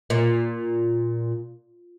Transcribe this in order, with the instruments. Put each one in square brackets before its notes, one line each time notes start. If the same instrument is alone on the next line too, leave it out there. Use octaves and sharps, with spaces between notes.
[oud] A#2